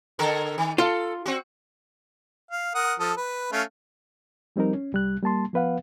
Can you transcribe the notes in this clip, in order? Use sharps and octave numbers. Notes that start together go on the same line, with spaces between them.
D3 A4 A#4
D#3
F4 A4
C4 F#4
F5
A#4 F#5 D#6
F3 A4 D#6
B4
A3 C#4 F5
F3 G3 C4 D#4 A#4
C#4
C2 G3 F#6
G3 A#3 A5 C6
F3 B3 B4 F5 F#5